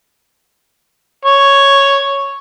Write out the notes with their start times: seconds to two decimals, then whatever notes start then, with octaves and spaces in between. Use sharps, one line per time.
1.25 C#5